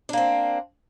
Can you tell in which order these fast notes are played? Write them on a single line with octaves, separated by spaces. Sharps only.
D4 A#3 C4